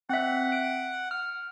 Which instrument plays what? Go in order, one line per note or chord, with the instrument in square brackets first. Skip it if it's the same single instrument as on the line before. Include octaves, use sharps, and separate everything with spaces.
[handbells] C4 E5 [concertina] F#5
[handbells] D7
F6